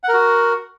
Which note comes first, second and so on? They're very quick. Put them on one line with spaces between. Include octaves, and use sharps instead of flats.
F#5 A#4 F#4